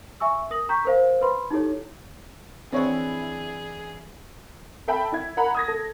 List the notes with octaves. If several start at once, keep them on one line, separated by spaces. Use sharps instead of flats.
E5 G#5 C#6 E6
A#4 D#6 A#6 F#7
G5 A#5 C#6 G6 B6
A#4 C5 F5
B4 B5 C6
D#4 E4 G4 A4 C#5
D3 E3 C4 E4 G#4 C#5 F#5
A4 E5 G5 A5 B5
E4 G#6
A#4 F#5 A#5 B5
D#6 G#6 A#6
A4